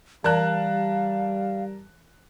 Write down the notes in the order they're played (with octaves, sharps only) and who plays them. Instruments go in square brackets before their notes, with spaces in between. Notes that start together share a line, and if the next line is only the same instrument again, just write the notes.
[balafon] E3 D5 [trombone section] G3 [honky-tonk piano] A#4 A5 F#6 [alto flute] F5